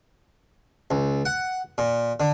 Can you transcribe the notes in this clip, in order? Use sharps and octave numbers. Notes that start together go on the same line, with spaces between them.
C#2
F#5
A#2
D3